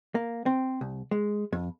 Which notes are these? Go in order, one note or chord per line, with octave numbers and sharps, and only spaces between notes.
A#3
C4
C2
G#3
F2